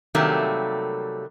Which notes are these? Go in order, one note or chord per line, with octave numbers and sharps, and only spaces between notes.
C3 D#3 F#3 G3 A3 A#3